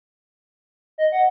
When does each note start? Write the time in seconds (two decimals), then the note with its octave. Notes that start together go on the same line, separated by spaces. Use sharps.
0.98 D#5
1.12 F#5